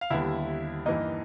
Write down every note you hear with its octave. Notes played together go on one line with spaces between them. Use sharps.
F5
D#2 D3 G3 B3 E4 E5
G2 E3 G3 A#3 D#4 D#5